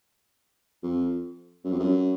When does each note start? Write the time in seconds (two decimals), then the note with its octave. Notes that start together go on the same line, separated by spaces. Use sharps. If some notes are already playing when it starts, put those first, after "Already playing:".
0.83 F2
1.64 F#2
1.72 F2
1.79 F#2